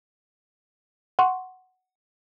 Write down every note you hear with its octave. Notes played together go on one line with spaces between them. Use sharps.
F#5 C6 C#6